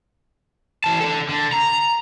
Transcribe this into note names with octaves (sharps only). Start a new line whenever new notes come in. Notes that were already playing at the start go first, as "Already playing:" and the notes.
E3 A5
D4 A4
D3
A#5